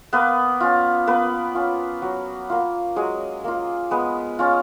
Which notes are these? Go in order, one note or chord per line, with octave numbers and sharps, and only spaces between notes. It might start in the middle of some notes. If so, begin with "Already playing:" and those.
A#3 B3 B4
C#4 F4
A#3 B3 B4
C#4 F4
F#3
A#3 F4
F#3 G#3 G#4
A#3 F4
G#3 B3 B4
C#4 F4